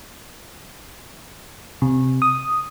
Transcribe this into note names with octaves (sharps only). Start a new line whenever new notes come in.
C3
D#6